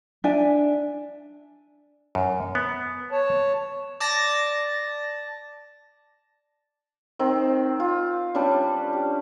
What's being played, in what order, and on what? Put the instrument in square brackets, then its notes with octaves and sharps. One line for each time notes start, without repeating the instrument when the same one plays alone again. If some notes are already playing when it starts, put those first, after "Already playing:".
[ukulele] D4 E5 G#5
[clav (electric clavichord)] F#2
B3
[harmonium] C#5 A5
[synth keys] D5 A5 A6 A#6
[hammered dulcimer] D#3 C4
F4
G3 C#4 D4 B4
G4